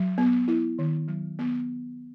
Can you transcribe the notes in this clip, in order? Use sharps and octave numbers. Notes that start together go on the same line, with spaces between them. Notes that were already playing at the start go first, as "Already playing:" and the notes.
Already playing: F#3
B3
E4
D#3
F#3
B3